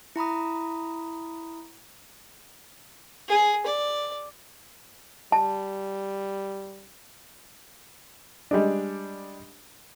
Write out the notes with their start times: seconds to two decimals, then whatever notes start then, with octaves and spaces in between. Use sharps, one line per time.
0.16 E4 A#5 B5 D#6
3.29 G#4
3.66 D5
5.32 G3 A5
8.51 G3 G#3 D4